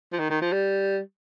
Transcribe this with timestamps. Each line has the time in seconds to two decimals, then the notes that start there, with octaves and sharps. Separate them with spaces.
0.12 F3
0.19 D#3
0.30 D#3
0.42 F3
0.53 G3